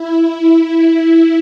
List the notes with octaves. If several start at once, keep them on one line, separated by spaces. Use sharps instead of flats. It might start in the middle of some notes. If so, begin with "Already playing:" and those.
Already playing: E4